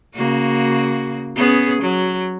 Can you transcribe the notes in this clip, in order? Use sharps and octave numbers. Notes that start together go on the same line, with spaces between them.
C#3 A#3 F#4
B3 C#4 G#4
F#3